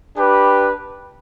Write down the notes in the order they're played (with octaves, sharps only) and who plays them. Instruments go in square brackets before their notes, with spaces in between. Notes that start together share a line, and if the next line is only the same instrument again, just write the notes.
[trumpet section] D4 G4 B4